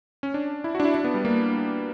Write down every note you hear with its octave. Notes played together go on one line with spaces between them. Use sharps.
C#4
D4
E4
F#4
D4
E4
D4
B3
G3
A#3